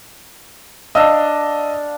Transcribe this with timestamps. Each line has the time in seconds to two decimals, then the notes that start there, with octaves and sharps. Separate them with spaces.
0.95 D4 D#5 F5 E6